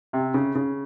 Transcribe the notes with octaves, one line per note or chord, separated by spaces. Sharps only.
C3
C#3
C#3